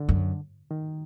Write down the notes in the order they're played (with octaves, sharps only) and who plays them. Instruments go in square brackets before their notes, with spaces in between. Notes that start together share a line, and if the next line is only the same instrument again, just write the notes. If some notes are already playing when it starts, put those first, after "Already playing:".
Already playing: [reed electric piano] D3
[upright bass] F#2
[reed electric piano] D#3